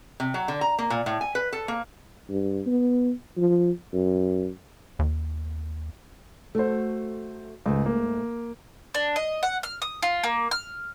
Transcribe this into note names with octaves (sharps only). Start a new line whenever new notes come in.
C3
F#3
D3
A#5
A#3
A#2
A2
G#5
B4
A4
A#3
G2
B3
F3
F#2
D#2
A3 F#4 A4 C5
C#2 G#2 A3
A#3
D4
D#5
F#5
F6
D#6
F4
A#3
F6